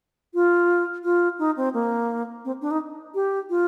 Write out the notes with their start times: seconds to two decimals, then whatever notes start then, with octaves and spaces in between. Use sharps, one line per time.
0.34 F4
1.04 F4
1.39 D#4
1.57 C4
1.74 A#3
2.45 C4
2.62 D4
2.71 D#4
3.15 G4
3.50 F4